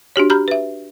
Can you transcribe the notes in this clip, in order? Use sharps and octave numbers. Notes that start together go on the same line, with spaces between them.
D4 F#4 G4 C#5
G4 A#5 B5 F6 G6
B4 E5